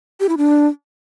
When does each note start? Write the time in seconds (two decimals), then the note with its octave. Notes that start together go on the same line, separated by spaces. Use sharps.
0.20 G4
0.29 E4
0.38 D4